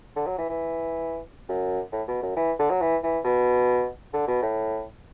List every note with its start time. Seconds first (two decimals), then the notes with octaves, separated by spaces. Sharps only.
0.16 D3
0.27 F#3
0.38 E3
0.49 E3
1.49 F#2
1.92 A2
2.08 B2
2.22 F#2
2.37 E3
2.59 D3
2.70 F#3
2.81 E3
3.03 E3
3.24 B2
4.13 D3
4.28 B2
4.42 A2